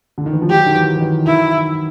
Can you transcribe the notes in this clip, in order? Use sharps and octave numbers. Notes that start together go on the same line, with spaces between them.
D3
D#3
E3
F3
F#3 G4
D#3
E3
E3
D#3
D#3 E4